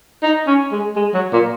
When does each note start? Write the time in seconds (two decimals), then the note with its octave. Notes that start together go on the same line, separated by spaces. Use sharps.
0.23 D#4
0.47 C#4
0.72 G#3
0.96 G#3
1.14 F#3
1.33 A#2